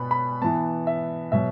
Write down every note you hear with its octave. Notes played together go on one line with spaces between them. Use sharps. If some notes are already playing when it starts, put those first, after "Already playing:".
Already playing: B2 B3 B5
B5
E3 B3 A5
E5
B2 F#3 E5